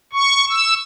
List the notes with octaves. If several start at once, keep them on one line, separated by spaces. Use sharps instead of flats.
C#6
E6